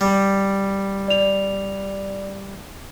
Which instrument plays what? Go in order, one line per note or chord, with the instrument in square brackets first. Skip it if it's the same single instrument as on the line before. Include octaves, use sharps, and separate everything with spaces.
[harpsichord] G3
[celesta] D5 F7